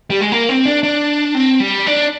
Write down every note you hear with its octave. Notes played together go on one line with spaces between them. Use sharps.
G3
G#3
A#3
C4
D4
D4
C4
G3
D4